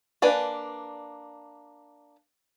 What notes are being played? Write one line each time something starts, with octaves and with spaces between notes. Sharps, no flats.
A#3 D4 B4 D5 G#5